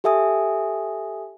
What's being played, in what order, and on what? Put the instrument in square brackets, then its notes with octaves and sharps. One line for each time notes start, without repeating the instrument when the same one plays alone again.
[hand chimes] G4 A4 E5 G#5 D#6